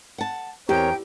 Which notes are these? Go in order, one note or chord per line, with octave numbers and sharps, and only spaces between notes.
F#5 A5
E2 C4 G4 A#4 C#5 G5